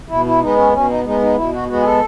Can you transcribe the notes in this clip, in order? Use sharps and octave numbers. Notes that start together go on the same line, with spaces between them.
B2 E4
E4
G#3 B3 D#4
C#4
B2 C#4
D#4
G#3 B3 D#4
D#4
B2 E4
F#4
G#3 B3 F#4
G#4
A4